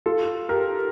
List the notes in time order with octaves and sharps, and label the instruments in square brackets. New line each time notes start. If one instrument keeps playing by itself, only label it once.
[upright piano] F4 A4
G4 A#4